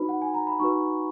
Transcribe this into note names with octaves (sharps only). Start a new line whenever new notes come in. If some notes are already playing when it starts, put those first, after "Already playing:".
Already playing: D#4 F#4 B4 B5
F#5
G#5
A#5
B5
D#4 F#4 B4 C#6